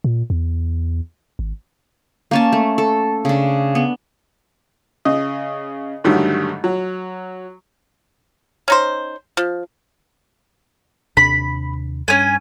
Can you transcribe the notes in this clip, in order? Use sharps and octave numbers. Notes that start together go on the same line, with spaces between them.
A#2
E2
G#1
A#3 C#4 A5
A3
A4
C#3 D4
B3
C#3 D#5
G#2 D3 D#3 F#3 G3 A3
F#3
C#4 D#4 C5
F3
D#2 C3 D4 B5
G2 C#4 G#5